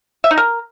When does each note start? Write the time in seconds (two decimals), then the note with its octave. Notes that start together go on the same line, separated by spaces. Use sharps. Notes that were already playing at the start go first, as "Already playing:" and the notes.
0.24 E5
0.31 D#4
0.38 A#4